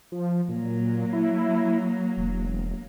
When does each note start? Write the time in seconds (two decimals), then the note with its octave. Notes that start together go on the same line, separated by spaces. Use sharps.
0.12 F3
0.49 A#2 F#3 A#3
1.13 E4
2.17 E1